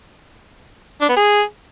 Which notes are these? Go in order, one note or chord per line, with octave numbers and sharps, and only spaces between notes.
D4
B3
G#4